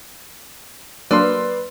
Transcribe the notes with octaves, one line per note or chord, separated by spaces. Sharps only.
F#3 A#3 D4 B4 D5 C6 E6 F6